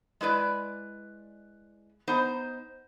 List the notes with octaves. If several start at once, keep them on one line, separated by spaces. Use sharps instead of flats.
G#3 E4 B4 D5
B3 D#4 C5